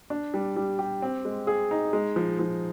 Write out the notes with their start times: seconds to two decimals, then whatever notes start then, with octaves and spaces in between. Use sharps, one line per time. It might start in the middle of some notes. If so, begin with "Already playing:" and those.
0.10 D4
0.34 G3
0.56 G3
0.79 G4
1.02 C4
1.25 G#3
1.47 G#4
1.71 D#4
1.93 G#3
2.16 F3
2.39 F3